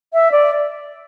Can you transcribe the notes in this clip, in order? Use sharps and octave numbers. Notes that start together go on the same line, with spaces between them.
E5
D5